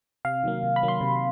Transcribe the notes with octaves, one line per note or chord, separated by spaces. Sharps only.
C3 F5
D#3 F#3 A#3
C3
B5
D#3 F#3 A#3
C6
C3